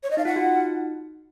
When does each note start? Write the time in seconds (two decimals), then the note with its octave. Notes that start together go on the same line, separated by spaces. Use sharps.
0.03 C#5
0.11 D#5
0.17 D#4 F5
0.25 F4 F#5
0.36 F#4
0.46 F4
0.55 D#4